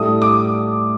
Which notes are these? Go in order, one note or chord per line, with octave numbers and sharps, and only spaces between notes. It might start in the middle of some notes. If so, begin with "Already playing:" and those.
Already playing: A2 G3 D4 A4 D#6
D6